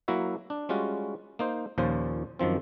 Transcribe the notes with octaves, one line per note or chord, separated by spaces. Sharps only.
F#3 A#3 E4 F#4 E5
D4
G3 G#3 C#4 F4 F#4
A#3 D#4 C5
D#2 A#2 F3 C#4 C5
F#2 D#3 F3 C4